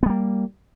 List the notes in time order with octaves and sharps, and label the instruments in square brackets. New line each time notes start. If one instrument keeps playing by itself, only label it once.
[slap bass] B3
G3
A#3